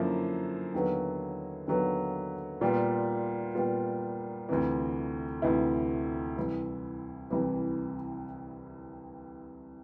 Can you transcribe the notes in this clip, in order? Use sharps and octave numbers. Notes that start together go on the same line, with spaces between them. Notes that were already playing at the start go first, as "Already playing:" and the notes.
Already playing: F#2 D3 F3 A#3 E4
D#2 D3 F#3 B3
D#2 D3 F#3 B3
A#2 G3 B3 F4
A#2 G3 B3 F4
D2 C3 E3
D2 C3 E3 E4
C2 C3 E3
C2 C3 E3